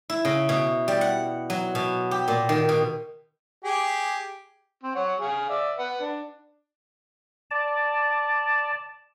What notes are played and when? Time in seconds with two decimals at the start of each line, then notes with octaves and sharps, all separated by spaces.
0.10 E4
0.25 C#3
0.49 B2
0.88 G3
1.01 F#5
1.50 F#3
1.75 B2
2.11 G4
2.28 A#2
2.49 D#3
2.69 B2
3.64 G4 G#4
4.83 C4
4.95 C#5 F#5
5.20 G#4 F5
5.49 D5 E5
5.79 B4 F#5
6.00 D4
7.51 D5 A5